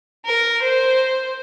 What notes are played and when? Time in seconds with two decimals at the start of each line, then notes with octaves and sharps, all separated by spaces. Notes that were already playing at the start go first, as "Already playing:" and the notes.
0.25 A#4
0.62 C5